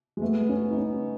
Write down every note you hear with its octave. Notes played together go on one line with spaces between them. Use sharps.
G#3
A3 B3
C#4
D#4
C#4